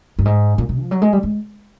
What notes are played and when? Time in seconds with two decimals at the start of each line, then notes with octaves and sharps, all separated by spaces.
0.19 G2
0.25 G#2
0.58 A#2
0.69 B2
0.80 F3
0.91 F#3
1.02 G#3
1.13 G3
1.23 G#3